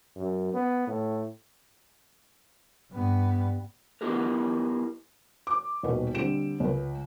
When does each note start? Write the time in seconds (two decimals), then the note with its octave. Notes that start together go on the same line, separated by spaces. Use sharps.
0.16 F#2
0.54 B3
0.87 A2
2.92 G2 B3
4.01 B3 E4 G4 G#4 A#4 B4
5.47 D6
5.83 D#1 B2 B4
6.15 D3 G3 C4 D7 E7
6.60 C#2 B4